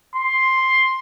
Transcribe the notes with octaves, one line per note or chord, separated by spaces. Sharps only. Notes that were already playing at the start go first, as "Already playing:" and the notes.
C6